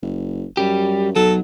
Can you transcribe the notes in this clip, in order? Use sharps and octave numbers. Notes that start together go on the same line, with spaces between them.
F#1
F#2 G3 G4
B1 F#3 A4